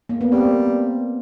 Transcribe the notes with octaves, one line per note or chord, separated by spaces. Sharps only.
A#3
B3
G3 A#3 C4